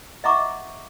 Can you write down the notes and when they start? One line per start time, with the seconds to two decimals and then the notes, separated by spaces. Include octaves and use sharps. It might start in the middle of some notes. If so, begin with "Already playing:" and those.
0.24 D#5 E5 F#5 A#5 C#6 D6